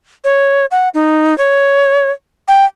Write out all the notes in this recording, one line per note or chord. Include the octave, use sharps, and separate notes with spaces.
C#5
F#5
D#4
C#5
G5